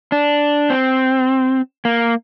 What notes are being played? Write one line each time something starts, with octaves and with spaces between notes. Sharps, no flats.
D4
C4
A#3